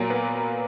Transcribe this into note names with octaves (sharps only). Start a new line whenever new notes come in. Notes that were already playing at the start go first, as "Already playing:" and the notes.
Already playing: A#2 F#3 A#3
B3